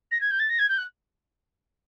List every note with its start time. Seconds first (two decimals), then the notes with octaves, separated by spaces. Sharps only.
0.11 A#6
0.21 G#6
0.31 G6
0.39 A6
0.49 A#6
0.59 G#6
0.69 G6
0.78 F#6